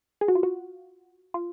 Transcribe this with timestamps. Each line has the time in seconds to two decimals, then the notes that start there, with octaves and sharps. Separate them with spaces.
0.21 G#4
0.28 F#4
0.35 F4
0.43 F#4
1.34 F4